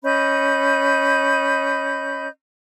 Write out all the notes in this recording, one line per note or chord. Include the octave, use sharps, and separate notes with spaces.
C#4 D#5 B5 G6